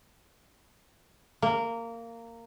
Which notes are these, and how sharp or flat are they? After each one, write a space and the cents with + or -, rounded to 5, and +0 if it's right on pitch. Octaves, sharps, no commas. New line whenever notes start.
A#3 -15